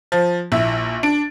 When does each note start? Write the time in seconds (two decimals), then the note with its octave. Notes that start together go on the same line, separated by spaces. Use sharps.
0.12 F3
0.52 A#1 E4
1.03 D4 D7